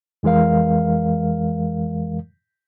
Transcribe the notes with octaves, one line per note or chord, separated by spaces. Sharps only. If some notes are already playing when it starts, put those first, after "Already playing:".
F2 E3 G#3 A#4 F5